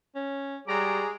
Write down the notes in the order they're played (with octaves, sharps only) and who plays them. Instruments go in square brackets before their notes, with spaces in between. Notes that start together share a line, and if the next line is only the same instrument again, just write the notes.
[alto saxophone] C#4
[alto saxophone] G3 [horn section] G#3 F#4 A#5 [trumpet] G#4 [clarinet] D6